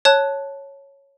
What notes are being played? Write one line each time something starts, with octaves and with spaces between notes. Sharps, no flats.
C#5 A5 F#6